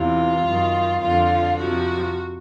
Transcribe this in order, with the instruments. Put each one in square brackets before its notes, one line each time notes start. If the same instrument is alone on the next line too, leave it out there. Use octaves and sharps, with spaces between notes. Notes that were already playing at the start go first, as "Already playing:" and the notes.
Already playing: [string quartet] E2 C3 E3 F4
F#2 D#3
F2 D3 F3 F4
F2 C3 F3 F#4